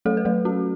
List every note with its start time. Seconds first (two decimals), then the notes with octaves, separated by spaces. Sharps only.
0.05 F#3 A3 A4
0.17 B4
0.25 F#3 A3 A4
0.45 C#4 F#4